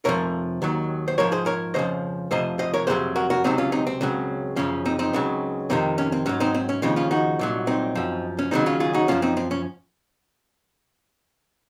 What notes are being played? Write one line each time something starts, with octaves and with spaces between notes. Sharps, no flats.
F2 C3 F3 A#4 C#5
D#2 D#3 F#3
C5
G#2 F3 A#4 C#5
G#4 C5
A#4 C#5
F2 C#3 F3 C5 D#5
F2 C3 F3 C5 D#5
C5 D#5
A#4 C#5
F2 C3 F#3 G#4 C5
F#4 A#4
F#4 A#4
C#2 C3 F#3 C4 D#4
C#4 F4
C4 D#4
C4
C#2 C#3 F#3
F#2 C#3 F3 C#4
C4 D#4
C4 D#4
C#2 C#3 F#3
F2 C3 D#3 C4 D#4
C#4
C4
G#2 F#3 C#4
C4 D#4
C4
C#4
D#2 C#3 F3 C4 D#4
C#4 F4
D#4 F#4
C2 A#2 F#3
C4 D#4
F#2 F3
C#4
D#2 C#3 F#3 C4 D#4
C#4 F4
F4 G#4
D#4 F#4
F#2 F3 C#4 F4
C4 D#4
C4
C#4